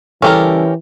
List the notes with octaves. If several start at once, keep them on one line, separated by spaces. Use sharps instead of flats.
C#3 E3 G3 C#4 G4 A4 A#4